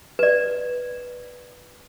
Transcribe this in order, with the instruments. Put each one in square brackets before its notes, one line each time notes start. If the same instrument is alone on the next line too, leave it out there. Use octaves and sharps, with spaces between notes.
[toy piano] B4 D5